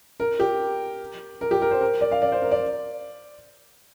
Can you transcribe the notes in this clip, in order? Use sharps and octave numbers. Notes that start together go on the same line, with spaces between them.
A#4
G4
A#4
G4
A#4
C5
A#4
D5
F5
D5
C5
A#4
D5